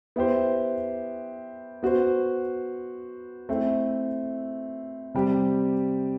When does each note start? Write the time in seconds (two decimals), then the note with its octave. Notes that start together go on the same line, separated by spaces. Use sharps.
0.16 B3 E4 G4 C5
1.83 B3 F#4 C5
3.49 A3 C4 E4
5.14 C3 G3 C4 G4